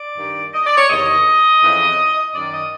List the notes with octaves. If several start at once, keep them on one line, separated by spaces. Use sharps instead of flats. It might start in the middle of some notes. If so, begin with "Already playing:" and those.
Already playing: D5
G2 D#3
D#5
D5
C#5
E2 C3 D#3 D#5
F2 C#3 E3
F#2 D#3 D5
D#5